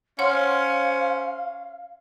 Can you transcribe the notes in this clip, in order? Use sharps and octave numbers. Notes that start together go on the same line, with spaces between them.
C#4 C5 C#5 F5 F#5 C6